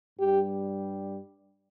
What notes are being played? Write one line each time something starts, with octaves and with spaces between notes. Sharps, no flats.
G2 G3 G4